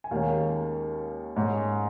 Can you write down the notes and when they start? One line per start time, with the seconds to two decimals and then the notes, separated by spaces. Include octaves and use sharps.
0.04 G#5
0.11 D#2 D#3 G#3 C#4 F5
1.36 G#2 G#3 C#4